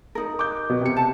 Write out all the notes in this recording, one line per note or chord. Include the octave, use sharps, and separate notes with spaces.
D#4 A#4
D6 G6
B2
C3 C#7
A5